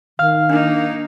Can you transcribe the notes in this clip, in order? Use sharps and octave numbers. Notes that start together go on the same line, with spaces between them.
D#3 F5 F6
A#3 D4 D#4